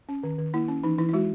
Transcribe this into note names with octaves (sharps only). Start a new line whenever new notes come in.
C#4
D#3
D#3
A#3 E4
C#4
E3 D#4
E3 E4
E4
G#3 F#4